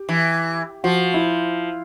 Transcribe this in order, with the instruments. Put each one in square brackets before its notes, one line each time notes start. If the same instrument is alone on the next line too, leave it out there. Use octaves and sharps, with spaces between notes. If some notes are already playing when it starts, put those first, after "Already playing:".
Already playing: [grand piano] G4
[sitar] E3
[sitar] F3 [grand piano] F#4
[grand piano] E4